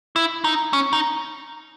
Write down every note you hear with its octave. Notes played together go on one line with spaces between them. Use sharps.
E4
D#4
C#4
D#4